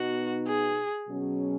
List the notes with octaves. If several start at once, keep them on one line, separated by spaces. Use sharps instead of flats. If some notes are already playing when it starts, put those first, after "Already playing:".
Already playing: B2 B3 D#4 F#4
G#4
B2 F#3 C#4 G#4